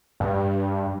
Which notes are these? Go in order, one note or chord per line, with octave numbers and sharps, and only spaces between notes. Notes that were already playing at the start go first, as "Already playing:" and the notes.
G2